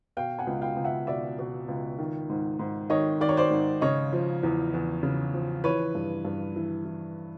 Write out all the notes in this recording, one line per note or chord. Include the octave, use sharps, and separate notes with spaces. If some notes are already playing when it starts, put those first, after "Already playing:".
B2 F5 G5
F#5 G#5
C#2
F5 G5
C#2
E5 F#5
B2 D5 E5
B2
C#2
D#3
G#2
G#2
D#3 C#5 D#5
D#3 D5
C#5
C5 D5
G#2
C#3 C#5 D#5
F3
E2
E2
C#3
F3
E3 B4 C#5
G2
G2
E3
E3